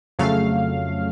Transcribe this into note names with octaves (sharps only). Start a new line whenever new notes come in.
F2 C#3 F#3 A3 F5